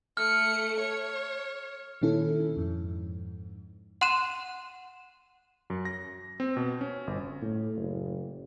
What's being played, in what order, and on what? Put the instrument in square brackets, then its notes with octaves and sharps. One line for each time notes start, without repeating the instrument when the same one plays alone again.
[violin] A3 C#7 [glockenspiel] F6
[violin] C#5
[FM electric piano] A#2 D#3 C#4 E4 A4
F2 G#2
[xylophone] F#5 C6 F#6 D#7 E7
[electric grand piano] F#2
A#6
C4
B2
C#4
G1
[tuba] A2
F#1